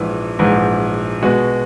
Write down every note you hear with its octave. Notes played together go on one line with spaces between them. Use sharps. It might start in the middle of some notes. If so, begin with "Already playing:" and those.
Already playing: A#1 G#2 E3
A#1 G#2 E3
B2 G#3 B3 F#4